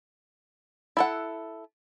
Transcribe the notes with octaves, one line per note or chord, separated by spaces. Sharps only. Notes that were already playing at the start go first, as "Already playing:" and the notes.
E4 A4 F#5